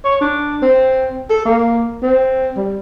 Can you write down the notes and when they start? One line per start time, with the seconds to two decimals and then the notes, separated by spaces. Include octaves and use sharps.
0.04 C#5
0.21 D4
0.62 C4
1.30 A4
1.45 A#3
2.02 C4
2.57 G3